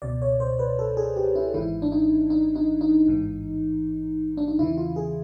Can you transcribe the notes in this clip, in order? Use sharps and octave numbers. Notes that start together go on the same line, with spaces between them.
C#2 B2 D5
C#5
C5
B4
A4
G#4
G4
E4
G#1 G#2 E3 E4
D4
D#4
D#4
D#4
D#4
A1 G#2 E3
D4
D#4
E2 C#3 E3 E4
F4
G#4